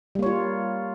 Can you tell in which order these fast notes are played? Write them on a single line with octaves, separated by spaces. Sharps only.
G3 A#3 C#5 F4